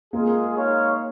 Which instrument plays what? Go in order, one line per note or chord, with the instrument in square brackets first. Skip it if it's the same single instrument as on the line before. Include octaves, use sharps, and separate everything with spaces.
[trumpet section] G#3 F4 G#4 [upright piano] A#3 A#4
[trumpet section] G#3 D#4 C#5 F5